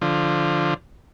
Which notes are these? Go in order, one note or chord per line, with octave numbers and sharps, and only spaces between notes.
D3 F3